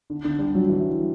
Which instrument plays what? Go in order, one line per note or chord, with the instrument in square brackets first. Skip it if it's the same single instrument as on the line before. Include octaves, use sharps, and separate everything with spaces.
[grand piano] D3
D3
G3
F#3
E3